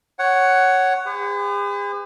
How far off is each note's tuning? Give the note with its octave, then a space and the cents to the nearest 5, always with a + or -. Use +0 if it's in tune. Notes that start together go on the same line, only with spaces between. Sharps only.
C#5 +0 F#5 +10
G#4 -45 B4 +45